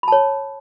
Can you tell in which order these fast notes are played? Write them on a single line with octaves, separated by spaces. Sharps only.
B5 A5 C#5